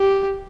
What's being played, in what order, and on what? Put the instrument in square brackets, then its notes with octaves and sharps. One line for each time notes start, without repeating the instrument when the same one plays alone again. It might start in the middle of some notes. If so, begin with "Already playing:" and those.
Already playing: [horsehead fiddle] G4